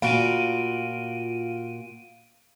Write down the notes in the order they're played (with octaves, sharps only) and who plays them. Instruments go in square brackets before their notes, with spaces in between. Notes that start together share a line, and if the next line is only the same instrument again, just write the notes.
[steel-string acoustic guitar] A#2 F4 F#4 [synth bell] F5 D7 D#7